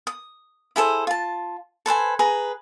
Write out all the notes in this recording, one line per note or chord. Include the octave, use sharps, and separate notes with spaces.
D#6
E4 G#4 A4 C5
F4 A5
A4 B4 C5 G#5
G#4 B4 A#5